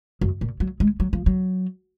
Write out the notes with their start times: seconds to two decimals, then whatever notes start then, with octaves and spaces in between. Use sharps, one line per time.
0.21 F#2
0.41 A#2
0.60 F#3
0.80 G#3
1.00 F#3
1.13 F3
1.26 F#3